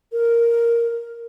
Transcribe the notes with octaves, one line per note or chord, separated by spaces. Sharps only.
A#4